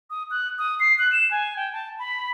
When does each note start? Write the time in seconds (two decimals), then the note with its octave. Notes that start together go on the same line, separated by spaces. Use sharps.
0.10 D#6
0.31 F#6
0.58 D#6
0.80 C7
0.99 F#6
1.12 E7
1.31 G#5
1.56 G5
1.73 A5
1.99 B5